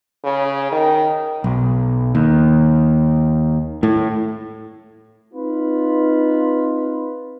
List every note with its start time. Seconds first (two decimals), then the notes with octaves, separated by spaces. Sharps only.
0.24 C#3
0.72 D#3
1.44 B1
2.15 D#2
3.83 A2
5.33 C4 D#4 F4 B4